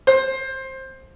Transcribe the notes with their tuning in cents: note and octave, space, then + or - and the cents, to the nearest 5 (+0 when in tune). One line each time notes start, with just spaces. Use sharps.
C5 +20